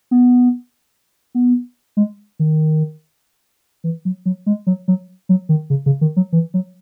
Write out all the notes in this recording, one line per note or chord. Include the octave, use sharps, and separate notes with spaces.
B3
B3
G#3
D#3
E3
F#3
F#3
G#3
F#3
F#3
F#3
D#3
C#3
C#3
D#3
F#3
E3
F#3